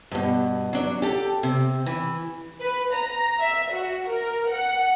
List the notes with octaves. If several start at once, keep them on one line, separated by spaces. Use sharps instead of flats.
G2 B2
F#3 D4
G4 A4
C3
E3
B4
A#5
E5
F#4
A#4
F#5